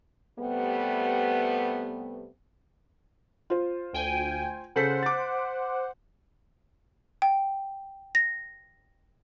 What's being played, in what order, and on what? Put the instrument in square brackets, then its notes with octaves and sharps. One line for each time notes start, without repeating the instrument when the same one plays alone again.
[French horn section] C3 G3 A3 B3
[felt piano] F4 C5
[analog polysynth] D2 G5 G#5
[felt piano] C#3 A4 B6 [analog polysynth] C5 F#5
[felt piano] D6 A6
[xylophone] G5
A#6